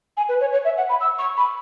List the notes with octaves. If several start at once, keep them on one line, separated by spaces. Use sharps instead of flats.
G#5
B4
C#5
C#5
E5
F#5
B5
E6
C#6
B5